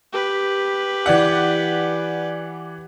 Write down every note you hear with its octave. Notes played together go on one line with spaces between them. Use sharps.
G4 B4
E3 D5 F#5